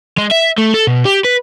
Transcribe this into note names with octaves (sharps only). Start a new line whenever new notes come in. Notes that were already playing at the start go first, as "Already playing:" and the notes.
G#3
E5
A3
A4
B2
G4
B4